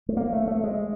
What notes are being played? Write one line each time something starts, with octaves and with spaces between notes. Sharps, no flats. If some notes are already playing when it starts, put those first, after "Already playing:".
A3
A#3
A3
A3
G#3